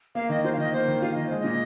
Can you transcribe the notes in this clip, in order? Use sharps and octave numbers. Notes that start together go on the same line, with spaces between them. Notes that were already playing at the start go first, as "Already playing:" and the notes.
A#3 F5
D#3 D#5
F4 C5
F5
D#3 D#5
A#3 C5
D#3
F4 F5
D#3 D#5
G#3 C5
A#2 D#5